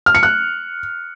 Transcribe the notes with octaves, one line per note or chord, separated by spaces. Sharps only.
F6
C#7
F#6